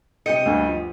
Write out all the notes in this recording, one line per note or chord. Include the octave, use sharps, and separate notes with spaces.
C3 G4 D#5 G5 C#7
D2 G2
F3